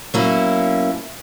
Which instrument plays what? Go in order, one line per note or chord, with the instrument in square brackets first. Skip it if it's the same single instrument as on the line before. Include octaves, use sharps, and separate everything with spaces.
[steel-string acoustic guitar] B2 F#3 A#3 C#4 E4